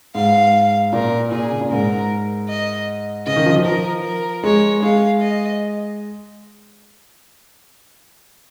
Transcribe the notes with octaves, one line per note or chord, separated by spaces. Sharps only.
G#2 F5
A#2 A#4
A#2 G#4
C#3
A#2
G#2 A#4
D#5
C#3 D#5
D#3
F3
F3
A#4
A#4
G#3 C#5
G#3 F5
D#5